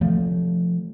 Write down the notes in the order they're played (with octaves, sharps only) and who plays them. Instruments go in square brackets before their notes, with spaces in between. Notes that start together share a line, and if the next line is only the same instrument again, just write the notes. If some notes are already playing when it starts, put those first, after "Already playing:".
[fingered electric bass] F3 A3